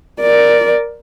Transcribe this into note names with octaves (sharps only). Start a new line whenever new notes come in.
A#4 D5